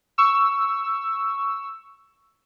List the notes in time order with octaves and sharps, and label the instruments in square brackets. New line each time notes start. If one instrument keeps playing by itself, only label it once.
[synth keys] C#6 E6